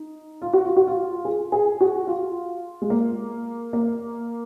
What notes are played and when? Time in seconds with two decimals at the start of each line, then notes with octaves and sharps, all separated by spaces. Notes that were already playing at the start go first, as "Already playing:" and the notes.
Already playing: D#4
0.42 F4
0.53 F#4
0.65 F4
0.76 F#4
0.87 F4
1.25 G#4
1.52 G#4
1.81 F#4
2.07 F4
2.82 G#3
2.90 A#3
3.73 A#3